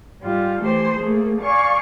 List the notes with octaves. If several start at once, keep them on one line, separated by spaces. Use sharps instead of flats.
G#2 G3 F4
E3 A3 G4 C5
A3 A#3 G#4
D5 F5 G#5 C#6